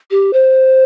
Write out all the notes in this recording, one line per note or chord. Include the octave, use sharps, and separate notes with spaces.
G4
C5